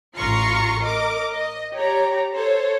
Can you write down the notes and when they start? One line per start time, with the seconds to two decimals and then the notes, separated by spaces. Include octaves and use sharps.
0.16 A1 F4 A#5 C6 C#6 C7
0.81 A#4 D#5 D6
1.33 D#5
1.73 G4 C#5 D5 A#5
2.35 A4 C5 C#5